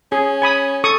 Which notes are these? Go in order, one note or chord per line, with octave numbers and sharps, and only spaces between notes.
C#4 G#4
G#5 B5 D#6
A4 C#6 D#6